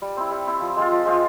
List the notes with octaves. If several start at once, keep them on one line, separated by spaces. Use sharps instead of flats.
G3
C4 E4
G3
C4 E4
F3
G#3 C4 F4
F3
G#3 C4 F4